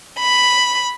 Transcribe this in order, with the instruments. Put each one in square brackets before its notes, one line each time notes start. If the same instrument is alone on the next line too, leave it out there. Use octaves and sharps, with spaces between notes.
[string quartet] B5